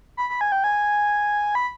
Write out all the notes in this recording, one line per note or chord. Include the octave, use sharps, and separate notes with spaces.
B5
B5
G#5
G5
G#5
B5